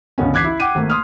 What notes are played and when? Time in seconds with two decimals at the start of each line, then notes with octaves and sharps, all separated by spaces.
0.18 C#2 D3 B3 C#4
0.33 A1 D6 F#6 G#6 B6 C7
0.44 E4
0.60 F#5 G5 D6 D#7
0.75 G#1 A3 A#3
0.90 C6 D#6 F6